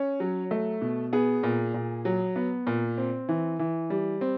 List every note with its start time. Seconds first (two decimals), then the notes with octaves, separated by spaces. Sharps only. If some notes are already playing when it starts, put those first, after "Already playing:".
Already playing: C#4
0.20 F#3
0.51 A3
0.81 B2
1.13 B3 G#4
1.43 A#2
1.74 A#2
2.05 F#3
2.36 B3
2.67 A#2
2.98 C4
3.29 E3
3.59 E3
3.90 G3
4.21 C4